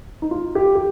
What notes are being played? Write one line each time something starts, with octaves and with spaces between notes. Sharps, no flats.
D#4
F4
G4
G4